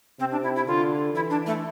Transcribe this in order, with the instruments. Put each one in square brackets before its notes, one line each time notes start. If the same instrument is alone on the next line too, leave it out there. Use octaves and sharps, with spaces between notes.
[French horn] C3 [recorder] C4
[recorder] D4
E4
E4
[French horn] D3 [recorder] F4
[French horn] E3 [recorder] E4
[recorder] D4
A3